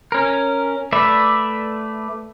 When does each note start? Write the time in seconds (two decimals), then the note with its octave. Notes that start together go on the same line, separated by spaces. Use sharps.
0.12 C#4 A#4
0.92 A3 B4 D5 E5